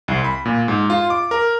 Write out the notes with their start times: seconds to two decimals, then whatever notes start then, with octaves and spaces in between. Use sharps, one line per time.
0.08 C2
0.24 B5
0.45 A#2
0.68 G#2
0.90 F4
1.10 D6
1.31 A#4